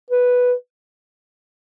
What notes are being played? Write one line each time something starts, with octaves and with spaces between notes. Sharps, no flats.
B4